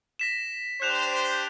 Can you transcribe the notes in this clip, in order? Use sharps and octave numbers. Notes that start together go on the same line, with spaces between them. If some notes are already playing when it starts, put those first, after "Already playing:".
A#6 B6 E7
D4 G4 C5 F#6 E7 F7